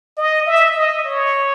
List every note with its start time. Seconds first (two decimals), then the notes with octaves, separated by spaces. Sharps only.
0.18 D#5
0.46 E5
0.75 D#5
1.04 C#5